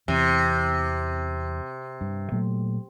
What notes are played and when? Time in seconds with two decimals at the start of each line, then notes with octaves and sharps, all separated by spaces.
0.08 E2 C3 E3
2.01 G2
2.32 A#2 F#3 A3